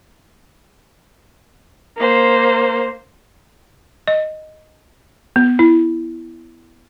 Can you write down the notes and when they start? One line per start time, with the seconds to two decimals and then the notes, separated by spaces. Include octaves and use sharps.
1.98 A#3 C5
4.08 D#5
5.36 B3
5.59 E4